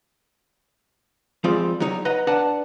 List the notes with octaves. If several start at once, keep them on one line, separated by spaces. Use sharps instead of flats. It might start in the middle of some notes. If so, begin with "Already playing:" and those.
F3 G3 G#3 C4 F4 D5
F#3 G3 D#4 C#5
B4 D#5 F#5 A#5
D4 B4 D5 F#5 A5